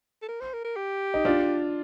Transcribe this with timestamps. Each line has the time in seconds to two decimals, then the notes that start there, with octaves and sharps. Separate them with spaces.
0.22 A4
0.28 A#4
0.40 C5
0.53 A#4
0.65 A#4
0.76 G4
1.14 D#4
1.25 D4 F4